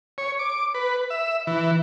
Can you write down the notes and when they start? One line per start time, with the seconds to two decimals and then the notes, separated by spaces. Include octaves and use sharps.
0.18 C#5
0.39 D6
0.74 B4
1.10 E5
1.47 E3